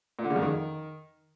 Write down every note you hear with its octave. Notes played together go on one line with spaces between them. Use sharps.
A#2
D3
C#3
F2
D#3